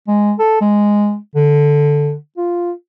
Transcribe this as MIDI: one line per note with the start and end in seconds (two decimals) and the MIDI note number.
0.08 0.33 56
0.39 0.59 69
0.61 1.16 56
1.36 2.14 50
2.37 2.71 65